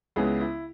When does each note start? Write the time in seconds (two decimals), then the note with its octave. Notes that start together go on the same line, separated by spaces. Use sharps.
0.16 C#2 C#3 G#3 B3 E4 G#4
0.41 E4